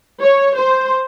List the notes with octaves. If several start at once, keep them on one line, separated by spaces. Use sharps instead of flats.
C#5
C5